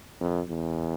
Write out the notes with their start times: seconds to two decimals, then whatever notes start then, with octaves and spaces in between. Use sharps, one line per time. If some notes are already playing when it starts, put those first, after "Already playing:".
0.21 F2
0.49 E2